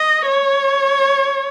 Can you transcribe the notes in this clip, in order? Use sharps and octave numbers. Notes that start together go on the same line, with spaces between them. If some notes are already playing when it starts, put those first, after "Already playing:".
Already playing: D#5
C#5